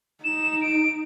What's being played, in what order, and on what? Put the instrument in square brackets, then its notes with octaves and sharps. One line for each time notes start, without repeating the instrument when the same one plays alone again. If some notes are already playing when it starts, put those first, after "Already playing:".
[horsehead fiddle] D#4 [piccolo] E7
[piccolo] D7